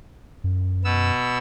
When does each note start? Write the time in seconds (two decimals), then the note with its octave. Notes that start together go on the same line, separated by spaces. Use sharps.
0.44 F#2
0.85 B2 B3 E6